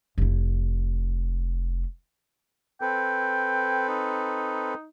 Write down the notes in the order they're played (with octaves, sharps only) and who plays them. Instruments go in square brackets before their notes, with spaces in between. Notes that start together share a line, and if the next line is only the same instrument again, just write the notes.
[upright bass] F1 E4
[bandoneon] C4 A4 B4 [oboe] G5
[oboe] D#4